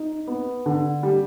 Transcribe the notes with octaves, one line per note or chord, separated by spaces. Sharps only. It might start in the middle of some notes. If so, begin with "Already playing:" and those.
Already playing: D#4
B3
D3
G3